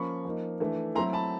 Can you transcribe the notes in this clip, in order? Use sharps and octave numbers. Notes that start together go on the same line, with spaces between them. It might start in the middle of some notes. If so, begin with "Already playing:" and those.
Already playing: F3 A#3 C#4 B5 C#6
F3 A#3 D#4
E3 A3 D4
F#3 A3 C4 E4 A#5 C6
A5 B5